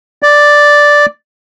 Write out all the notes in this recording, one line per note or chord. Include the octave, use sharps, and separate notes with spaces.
D5